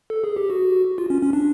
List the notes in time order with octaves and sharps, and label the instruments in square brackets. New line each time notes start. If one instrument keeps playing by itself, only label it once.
[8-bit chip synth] A4
G#4
G4
F#4
F4
C#4
C#4
D4